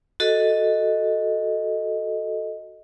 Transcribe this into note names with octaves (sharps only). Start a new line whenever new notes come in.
F#4 A4 D#5